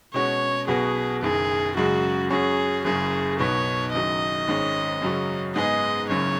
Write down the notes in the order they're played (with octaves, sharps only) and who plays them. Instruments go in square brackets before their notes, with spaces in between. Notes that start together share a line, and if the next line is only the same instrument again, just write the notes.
[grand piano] B2 G#3 C#4 F#4 [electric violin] C#5
[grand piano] B1 B2 B3 F#4 [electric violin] G#4
[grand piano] F#1 F#2 D#3 [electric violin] G#4
[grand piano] F#2 C#3 G#3 [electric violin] F#4
[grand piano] F#2 F#3 C#4 F#4 [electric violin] G#4
[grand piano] F#1 F#2 C#3 [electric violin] G#4
[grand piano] B1 B2 B3 D#4 [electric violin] C#5
[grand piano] F#1 F#2 D#3 F#3 [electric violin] D#5
[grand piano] G#1 G#2 G#3 C#4
F#2 C#3 F#3 C#4
[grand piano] G#2 G#3 B3 D#4 G#4 [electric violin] D#5
[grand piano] F#1 F#2 C#3 [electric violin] C#5